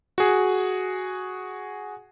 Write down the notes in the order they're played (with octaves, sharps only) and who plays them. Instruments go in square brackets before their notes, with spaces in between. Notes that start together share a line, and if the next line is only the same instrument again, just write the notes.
[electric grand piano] F#4 G#4